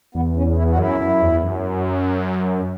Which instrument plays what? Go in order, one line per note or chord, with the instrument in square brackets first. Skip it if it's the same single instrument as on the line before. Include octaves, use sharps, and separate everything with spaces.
[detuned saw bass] E2 [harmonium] B3
[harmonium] C#4
E4
F#4
[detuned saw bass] F#2 [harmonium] E4
[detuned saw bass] F#2
E2
F#2